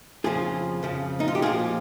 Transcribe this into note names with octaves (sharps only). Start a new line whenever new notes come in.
F2 C#3 F3 F4 G#4
F2 C#3 F3
D#4
F4
G4
A#2 F3 F4 G#4